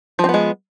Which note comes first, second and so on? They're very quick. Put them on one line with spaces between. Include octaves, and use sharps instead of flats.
F3 C4 B3 G#3